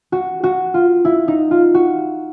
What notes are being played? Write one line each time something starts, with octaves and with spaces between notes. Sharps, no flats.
F#4
F#4
F4
E4
D#4
F4
F#4